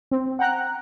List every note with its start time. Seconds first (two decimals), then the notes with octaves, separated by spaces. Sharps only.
0.11 C4
0.39 F#5 G5 A#5 F#6